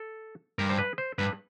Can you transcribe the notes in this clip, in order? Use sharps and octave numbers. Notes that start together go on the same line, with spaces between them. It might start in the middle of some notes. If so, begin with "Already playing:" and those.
Already playing: A4
G2 A#4
C5
B4
C5
G2 B4